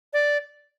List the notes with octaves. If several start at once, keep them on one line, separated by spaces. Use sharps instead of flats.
D5